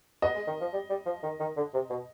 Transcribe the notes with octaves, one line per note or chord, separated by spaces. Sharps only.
B3 D#5
G#3
D#3
F3
G3
G3
F3
D#3
D#3
D3
C3
B2